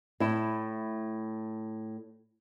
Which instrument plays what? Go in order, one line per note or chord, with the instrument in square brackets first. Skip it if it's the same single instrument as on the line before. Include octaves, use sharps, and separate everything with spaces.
[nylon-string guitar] A2 E4